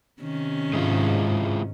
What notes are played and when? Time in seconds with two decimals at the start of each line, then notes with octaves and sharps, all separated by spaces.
0.21 C3 D#3 C#4
0.73 G#2 G#3 E4 F4